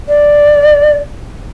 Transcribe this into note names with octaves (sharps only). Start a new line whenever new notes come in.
D5